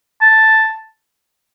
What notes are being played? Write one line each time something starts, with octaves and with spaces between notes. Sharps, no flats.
A5